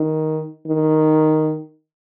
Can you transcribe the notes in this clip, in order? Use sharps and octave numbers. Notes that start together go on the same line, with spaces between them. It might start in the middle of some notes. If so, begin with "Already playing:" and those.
Already playing: D#3
D#3